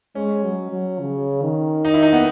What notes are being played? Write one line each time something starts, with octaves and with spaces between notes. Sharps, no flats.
G#3 C#4
F#3
F#3
C#3
D#3
D#4
E4
D#4
B3